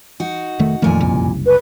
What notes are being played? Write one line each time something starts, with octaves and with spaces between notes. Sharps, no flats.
D#4 F#4
F1 D#3 A3
F2 A#2 D#3 A3 G#5
F#1 C2
B4